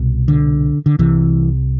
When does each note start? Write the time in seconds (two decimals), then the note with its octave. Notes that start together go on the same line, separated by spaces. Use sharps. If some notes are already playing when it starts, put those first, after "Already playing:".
Already playing: C2 B2
0.28 D3
0.86 D3
0.99 C2 C3 E3